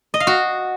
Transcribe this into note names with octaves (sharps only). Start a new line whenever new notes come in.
D#5
F5
F#4